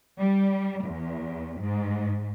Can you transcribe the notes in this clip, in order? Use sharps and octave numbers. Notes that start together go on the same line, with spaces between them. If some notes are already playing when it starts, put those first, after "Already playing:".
G3
E2
G#2